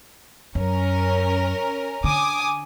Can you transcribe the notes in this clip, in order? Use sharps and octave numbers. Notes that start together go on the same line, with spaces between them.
F#2 C#4 A#4
D3 G#5 D6 D#6